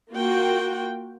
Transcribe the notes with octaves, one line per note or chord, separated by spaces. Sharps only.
A#3 F4 F#4 G5